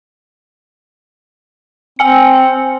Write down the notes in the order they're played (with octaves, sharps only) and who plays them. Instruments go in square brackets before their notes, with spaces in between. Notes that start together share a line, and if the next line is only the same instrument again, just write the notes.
[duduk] C4 [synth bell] G5 G#5 C#7